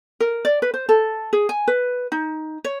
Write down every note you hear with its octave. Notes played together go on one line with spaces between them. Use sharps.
A#4
D5
B4
C5
A4
G#4
G#5
B4
D#4
C#5